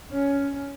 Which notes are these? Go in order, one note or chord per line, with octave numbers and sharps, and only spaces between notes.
C#4